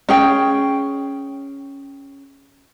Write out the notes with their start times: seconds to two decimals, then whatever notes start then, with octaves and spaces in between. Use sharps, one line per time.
0.09 C#4 G#4 G5